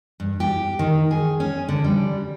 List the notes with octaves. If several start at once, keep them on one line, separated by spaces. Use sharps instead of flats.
G2
G4
D#3
G#4
C#4
D3
G3